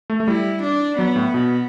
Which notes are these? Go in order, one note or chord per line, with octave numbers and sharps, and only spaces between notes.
A3
A3
G3 E4
D4
F#3 B3
A2
B2